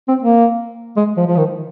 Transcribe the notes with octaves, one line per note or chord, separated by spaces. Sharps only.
C4
A#3
G#3
F3
F3
D#3